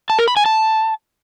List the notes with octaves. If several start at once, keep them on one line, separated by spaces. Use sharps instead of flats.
A5
A#4
B5
G#5
A5